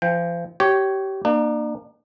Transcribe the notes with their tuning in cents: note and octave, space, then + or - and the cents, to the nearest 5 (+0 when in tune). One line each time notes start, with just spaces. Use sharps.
F3 -35 G5 +10
G4 -25 C#5 +0
A#3 +0 D4 +40